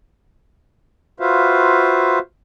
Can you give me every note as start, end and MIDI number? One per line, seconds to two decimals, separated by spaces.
1.20 2.19 65
1.20 2.19 66
1.20 2.19 71
1.20 2.19 72
1.20 2.19 76
1.20 2.19 77